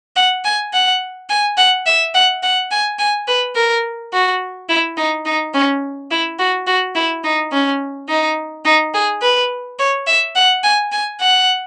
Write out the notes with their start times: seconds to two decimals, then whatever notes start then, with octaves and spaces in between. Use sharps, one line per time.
0.16 F#5
0.45 G#5
0.73 F#5
1.29 G#5
1.58 F#5
1.86 E5
2.14 F#5
2.43 F#5
2.71 G#5
2.99 G#5
3.28 B4
3.55 A#4
4.13 F#4
4.69 E4
4.97 D#4
5.26 D#4
5.54 C#4
6.11 E4
6.39 F#4
6.67 F#4
6.95 E4
7.24 D#4
7.52 C#4
8.09 D#4
8.65 D#4
8.94 G#4
9.22 B4
9.79 C#5
10.07 E5
10.35 F#5
10.63 G#5
10.92 G#5
11.21 F#5